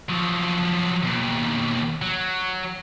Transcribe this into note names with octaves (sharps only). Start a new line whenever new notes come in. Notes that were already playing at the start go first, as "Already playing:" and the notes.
F3 F#3
D#2 B2
F#3